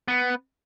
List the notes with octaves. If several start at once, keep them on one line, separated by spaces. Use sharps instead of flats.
B3